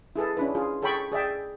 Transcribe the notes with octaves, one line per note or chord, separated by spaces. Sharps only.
E4 G#4 A4 B4
C#4 D4 E4 B4
F4 G#4
G#4 A4 C#5 G5 B5 C#6
G#4 D5 E5 G5